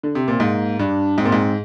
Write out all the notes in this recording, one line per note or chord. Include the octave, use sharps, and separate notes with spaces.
D3
C3
A#2 C4
G#2 A#3
G2 D4
G#2 C4
A#2
G#2